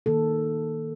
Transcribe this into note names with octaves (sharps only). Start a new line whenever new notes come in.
D#3 A#3 A4